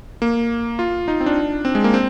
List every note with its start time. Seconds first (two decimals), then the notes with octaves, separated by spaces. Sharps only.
0.22 A#3
0.79 F4
1.08 D#4
1.20 C4
1.26 D4
1.65 C4
1.75 G#3
1.84 A#3
1.94 C4